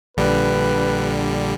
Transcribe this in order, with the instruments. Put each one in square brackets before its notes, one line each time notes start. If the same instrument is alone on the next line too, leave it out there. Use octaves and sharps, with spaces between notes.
[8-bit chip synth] A#1 D3 G3 [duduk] B4